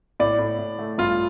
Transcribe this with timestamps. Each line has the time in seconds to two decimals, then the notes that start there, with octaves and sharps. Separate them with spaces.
0.20 A2 D5
0.39 A2
0.58 A2
0.79 A3
0.98 G2 F4